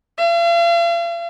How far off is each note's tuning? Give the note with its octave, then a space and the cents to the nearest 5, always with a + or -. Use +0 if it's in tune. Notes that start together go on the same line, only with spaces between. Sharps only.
F5 -45